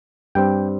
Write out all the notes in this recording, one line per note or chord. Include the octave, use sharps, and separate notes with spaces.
G2 G3 C4 G5